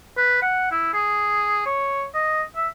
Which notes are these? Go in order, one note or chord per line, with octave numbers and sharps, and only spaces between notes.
B4
F#5
E4
G#4
C#5
D#5
E5